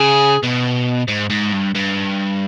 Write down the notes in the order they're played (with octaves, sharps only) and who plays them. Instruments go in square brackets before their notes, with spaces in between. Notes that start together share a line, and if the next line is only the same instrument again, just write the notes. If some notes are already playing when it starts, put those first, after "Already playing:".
Already playing: [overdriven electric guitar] C#3 [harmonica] G#4
[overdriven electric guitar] B2
G#2
G#2
G2
G2